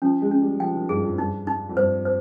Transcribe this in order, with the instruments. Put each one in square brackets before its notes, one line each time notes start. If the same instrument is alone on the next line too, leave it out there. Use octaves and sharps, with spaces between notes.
[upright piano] F3 [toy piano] C#4
[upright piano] G#3
[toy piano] C#4
[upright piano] G3
[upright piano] F3 [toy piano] G5
[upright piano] D#3
[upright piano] G2 [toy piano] G#4
[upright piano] F2
[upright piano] G2 [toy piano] D#4
[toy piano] D#4
[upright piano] F2
[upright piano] G2 [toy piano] C5
[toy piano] C5